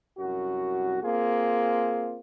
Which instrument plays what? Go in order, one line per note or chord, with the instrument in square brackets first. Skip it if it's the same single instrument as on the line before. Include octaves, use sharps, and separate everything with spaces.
[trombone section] C2 F#2 F#4
A#3 C4 F4 G#4